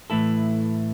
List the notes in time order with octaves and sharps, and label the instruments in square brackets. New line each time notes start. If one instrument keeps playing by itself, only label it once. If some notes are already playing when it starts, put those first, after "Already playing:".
[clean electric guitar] A2 E3 A3 E4 A4